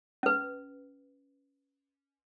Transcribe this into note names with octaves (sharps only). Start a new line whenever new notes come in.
C#4 B4